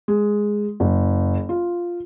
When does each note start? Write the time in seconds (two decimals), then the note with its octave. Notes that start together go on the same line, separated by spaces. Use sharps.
0.08 G#3
0.80 F#1
1.49 F4